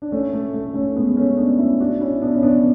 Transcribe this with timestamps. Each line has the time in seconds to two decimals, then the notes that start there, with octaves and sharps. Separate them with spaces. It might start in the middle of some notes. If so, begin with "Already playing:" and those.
0.02 D4
0.11 A3 C#4
0.33 A3
0.54 A3
0.74 A3 C#4
0.96 G#3 B3
1.17 A3 C#4
1.37 B3 D4
1.58 C#4 E4
1.80 D4 F#4
2.01 C#4 E4
2.22 B3 D4
2.33 C#4
2.43 B3 D4